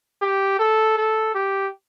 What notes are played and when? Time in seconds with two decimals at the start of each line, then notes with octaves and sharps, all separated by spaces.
0.22 G4
0.59 A4
0.97 A4
1.35 G4